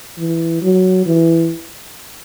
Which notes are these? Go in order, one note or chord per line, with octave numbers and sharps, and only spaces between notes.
E3
F#3
E3